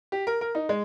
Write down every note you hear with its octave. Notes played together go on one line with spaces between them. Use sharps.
G4
A#4
A#4
D#4
G#3